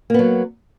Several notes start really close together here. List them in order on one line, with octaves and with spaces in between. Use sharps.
A#3 B3 F#3